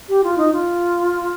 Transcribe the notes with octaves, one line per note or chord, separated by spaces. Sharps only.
G4
F4
D#4
F4